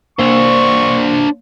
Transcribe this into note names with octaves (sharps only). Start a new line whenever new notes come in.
A#3 D4 C5 C#6